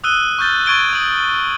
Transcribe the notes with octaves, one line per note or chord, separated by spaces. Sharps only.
D#6 E6 F#6 D#7 G7
C#6 F6 G6 A6 G7
C#6 G#6 A6 D7 D#7 G7
D#6 F#7